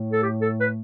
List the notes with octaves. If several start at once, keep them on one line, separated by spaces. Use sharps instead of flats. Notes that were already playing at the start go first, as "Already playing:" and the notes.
Already playing: A2 A3
A4
G4
A4
B4